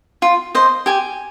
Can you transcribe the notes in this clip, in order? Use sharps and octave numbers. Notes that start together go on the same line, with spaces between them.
F4
C5 D#5
G4 G#5